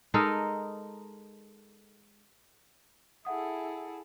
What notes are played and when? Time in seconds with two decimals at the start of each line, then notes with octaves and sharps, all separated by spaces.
0.14 G#3 D#4 A4 A#4
3.25 E4 G#4 A4 E5 F#5 D#6